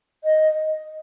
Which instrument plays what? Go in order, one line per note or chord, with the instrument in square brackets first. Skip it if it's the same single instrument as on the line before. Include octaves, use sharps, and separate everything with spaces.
[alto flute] D#5